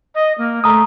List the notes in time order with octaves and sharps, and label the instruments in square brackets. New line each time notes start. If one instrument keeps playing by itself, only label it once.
[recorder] D#5
A#3
[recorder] A3 [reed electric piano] A#5 D#6